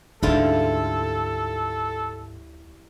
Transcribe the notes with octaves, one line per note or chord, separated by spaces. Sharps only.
D2 G#2 D3 G3 C#4 E4 F4 A4